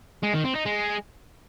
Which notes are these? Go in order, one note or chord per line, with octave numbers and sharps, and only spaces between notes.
G#3
D#3
C4
D#4
G#3